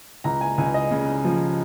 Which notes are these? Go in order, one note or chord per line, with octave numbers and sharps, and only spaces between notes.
C#2 A#5
G#5
C#2 G#5
D#5
C#3
F3